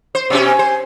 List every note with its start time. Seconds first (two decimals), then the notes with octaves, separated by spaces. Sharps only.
0.15 C5
0.30 B2 C#4 G4
0.46 G#5
0.59 C5